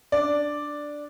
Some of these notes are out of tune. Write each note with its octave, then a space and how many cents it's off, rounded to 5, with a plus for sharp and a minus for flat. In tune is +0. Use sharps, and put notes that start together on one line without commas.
D4 +0 D5 +0